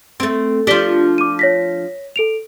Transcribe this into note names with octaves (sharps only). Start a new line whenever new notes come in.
A3 C4
F3 D4 G4 B6 G7
D6 D#7
C#5 A#6 B6
A4 D7 F7